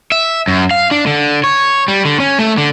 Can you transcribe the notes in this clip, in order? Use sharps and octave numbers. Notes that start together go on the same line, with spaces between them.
E5
F#2
F5
D4
D3
C#5
G3
D3
C#4
A3
D3